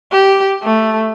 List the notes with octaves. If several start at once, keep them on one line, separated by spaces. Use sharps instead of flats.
G4
A3